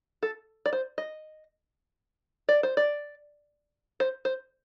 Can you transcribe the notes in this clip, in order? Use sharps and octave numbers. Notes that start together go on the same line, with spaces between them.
A4
D5
C5
D#5
D5
C5
D5
C5
C5